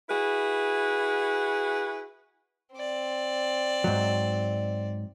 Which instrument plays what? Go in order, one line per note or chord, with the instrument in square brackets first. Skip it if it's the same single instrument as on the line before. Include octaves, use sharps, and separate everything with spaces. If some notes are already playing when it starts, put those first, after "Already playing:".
[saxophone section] E4 F#4 G#4 B4
[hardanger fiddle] C4 D5
[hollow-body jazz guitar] G#2 F#3